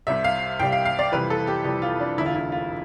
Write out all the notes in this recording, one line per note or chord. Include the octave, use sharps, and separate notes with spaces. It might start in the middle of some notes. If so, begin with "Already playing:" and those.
C2 C3 G3 E5
F5
C2 C3 G3 G5
F5
F5
D5
F2 C3 E3 G3 B4
A4
G4
F2 C3 E3 G3 G4
F4
D4
E1 D2 D3 E4
F4
E4
F4